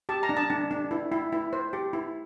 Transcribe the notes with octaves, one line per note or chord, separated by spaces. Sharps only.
G4 A5
A#5
D4
A5
D4
D4
E4
E4
E4
C5
G4
E4